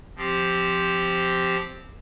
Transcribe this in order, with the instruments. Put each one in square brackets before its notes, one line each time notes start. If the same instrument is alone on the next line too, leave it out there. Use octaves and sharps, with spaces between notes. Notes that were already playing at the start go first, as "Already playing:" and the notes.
[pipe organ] F3 C4 G4 C5